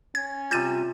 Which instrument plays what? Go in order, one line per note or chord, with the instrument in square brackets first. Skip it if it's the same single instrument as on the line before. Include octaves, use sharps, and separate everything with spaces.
[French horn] C#4 [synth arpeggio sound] G#6
[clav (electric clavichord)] C3 G3 [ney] F4 [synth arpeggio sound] G6 A6 D#7